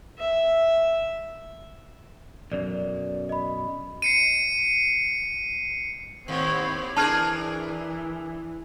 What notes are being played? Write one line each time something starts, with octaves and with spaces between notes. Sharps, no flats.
E5
B1 F#2 D5
D#5 B5
C7 C#7 D#7
D#2 A2 C4 C#5
E3 D4 G#4 A#4 A5 F6 G#6